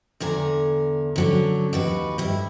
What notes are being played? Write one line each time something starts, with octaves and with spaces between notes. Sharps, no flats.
E2 D3 G#5 A#5
D3 F#3 C#4
D#2 F#4 B4
G2 E4